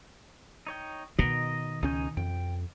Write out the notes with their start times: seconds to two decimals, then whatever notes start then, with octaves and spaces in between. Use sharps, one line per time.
0.67 D#4 C#5 G5
1.19 B2 D#3 D#5 A#5
1.83 C#2 C#4 D#4 G#5 G6
2.17 F2 G5